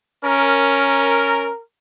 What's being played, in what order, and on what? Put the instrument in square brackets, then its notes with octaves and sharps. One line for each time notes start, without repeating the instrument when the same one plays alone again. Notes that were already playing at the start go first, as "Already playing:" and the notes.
[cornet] C#4 [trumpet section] A#4